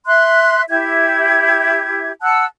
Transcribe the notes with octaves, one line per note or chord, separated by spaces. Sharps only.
E5 C6 F#6
E4 G4 E5 G#6
F#5 A5 E6 F#6